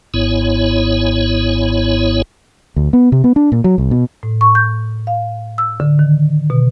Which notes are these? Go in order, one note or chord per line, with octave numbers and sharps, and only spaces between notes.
G#1 G#2 B3 E4 C#5
D2
B3
C3
B3
D4
A#2
F#3
C2
B2
A2
C#6
G6
F5
E6
D3
D#3
B2